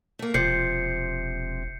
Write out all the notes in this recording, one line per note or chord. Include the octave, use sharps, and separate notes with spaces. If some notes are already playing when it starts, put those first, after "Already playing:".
A3 A#3
E1 C3 F3 G6 C7 C#7